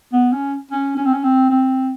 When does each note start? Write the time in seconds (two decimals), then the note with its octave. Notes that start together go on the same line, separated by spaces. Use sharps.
0.13 B3
0.32 C#4
0.71 C#4
0.97 C#4
1.05 C4
1.13 C#4
1.23 C4
1.50 C4